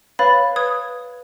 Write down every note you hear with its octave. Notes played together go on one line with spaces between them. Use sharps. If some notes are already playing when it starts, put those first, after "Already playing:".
B4 C#5 F5 B5 A6
B4 D#6 G#6